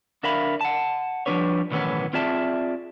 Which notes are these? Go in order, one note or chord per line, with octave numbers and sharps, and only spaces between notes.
D2 D4 A#4 E5 F5 B5
F#5 A5
F3 G3 A#3 D4 B4 C#5
B1 A2 D#3 E3 B3 C#4
C4 F4 G#4 D5 E5 A5